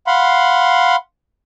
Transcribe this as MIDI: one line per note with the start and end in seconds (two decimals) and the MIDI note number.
0.07 0.96 77
0.07 0.96 78
0.07 0.96 83
0.07 0.96 84